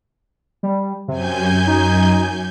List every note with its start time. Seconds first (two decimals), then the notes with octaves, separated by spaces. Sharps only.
0.63 G3
1.08 F#2 C3 G#5 G6
1.67 D#4